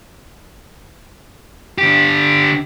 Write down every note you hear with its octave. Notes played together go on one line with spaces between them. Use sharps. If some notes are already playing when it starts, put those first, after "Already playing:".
D3 G4